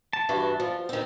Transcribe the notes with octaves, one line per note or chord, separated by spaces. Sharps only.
A5
G2 E3 F#4
F3
D#3 C4